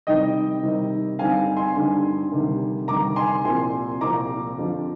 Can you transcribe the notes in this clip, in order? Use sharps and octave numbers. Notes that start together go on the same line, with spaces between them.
C3 D#3 G3 C4 D#4 D#5 G5
C3 D#3 G3 C4 D#4
G2 D3 G3 C4 D#4 F5 G#5
G#5 C6
G2 D3 G3 C4 D#4
D2 C3 D#3 G3
D2 C3 D#3 G3 A#5 D6
G#5 C6
C2 A#2 F3 C4 F4 G#5 C6
C2 A#2 F3 C4 F4 A#5 D6
F2 D3 F3 C4 F4